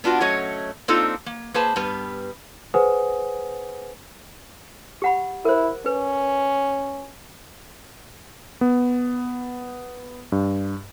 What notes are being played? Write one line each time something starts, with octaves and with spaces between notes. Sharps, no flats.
B3 D4 F4 F#4
F#3 A3 C#4 C#5 D#5
A#3 C4 D4 D#4 F4 A4
A#3
A#3 G#4 B4 C5 A5
G2 G3 B3 B4
G#4 B4 C5 F#5 G#5 D#6
G4 F#5 B5
E4 A#4 C5
C#4 B4
B3
G2